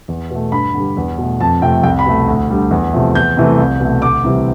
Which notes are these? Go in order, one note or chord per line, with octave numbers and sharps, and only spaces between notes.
E2
B2 A3
G2 B5
D3 G3
E2
B2 A3
F2 A5
C3 F3 A3 G5
C2 G5
B5
B2 A3
D2
D3 G3
E2
C3 F3 A3
E2 G6
C3 E3 A3
C2
B2 A3
D2 D6
C3 E3 G3